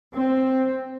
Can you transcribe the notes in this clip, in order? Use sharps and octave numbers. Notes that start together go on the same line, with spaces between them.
C4